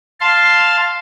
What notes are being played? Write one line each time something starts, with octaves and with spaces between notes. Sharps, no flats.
F5 A5 C6